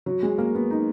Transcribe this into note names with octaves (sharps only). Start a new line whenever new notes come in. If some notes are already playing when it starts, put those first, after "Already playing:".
F#3
G#3
A#3
B3
D#4